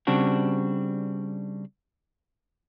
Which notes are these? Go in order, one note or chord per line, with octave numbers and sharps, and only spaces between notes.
C#3 G3 C4 D4 F#4